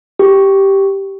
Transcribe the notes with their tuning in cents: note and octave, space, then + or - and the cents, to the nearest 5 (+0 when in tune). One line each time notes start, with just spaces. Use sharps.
G4 -5